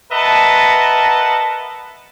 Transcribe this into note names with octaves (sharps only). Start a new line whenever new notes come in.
A#4 B4 D#5 E5 F#5 A5